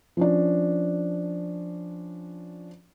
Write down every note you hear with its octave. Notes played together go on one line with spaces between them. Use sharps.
F3 C#4 D4